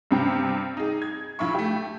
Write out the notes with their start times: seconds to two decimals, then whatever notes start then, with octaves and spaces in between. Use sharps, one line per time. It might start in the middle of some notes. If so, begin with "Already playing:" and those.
0.11 G2 C3 G5
0.77 D#4 G#4
1.02 G#6
1.39 A#1 E4 F4 E5 B5 C#6
1.55 A3 G4